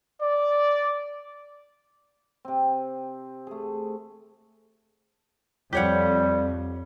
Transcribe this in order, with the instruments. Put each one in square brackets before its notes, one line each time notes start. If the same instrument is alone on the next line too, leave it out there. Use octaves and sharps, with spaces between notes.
[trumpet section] D5
[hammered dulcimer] C3 C4
A3 G#4
[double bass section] F2 [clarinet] G3 [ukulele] G4 C#5 F#5